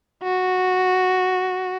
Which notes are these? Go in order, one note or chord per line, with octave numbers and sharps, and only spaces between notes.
F#4